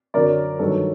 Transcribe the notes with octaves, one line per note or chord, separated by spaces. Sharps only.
F#2 D3 F#3 A#4 D5
G2 D#3 F#3 A4